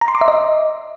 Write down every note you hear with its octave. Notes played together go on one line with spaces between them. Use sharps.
A#5
C6
D6
E5
D#5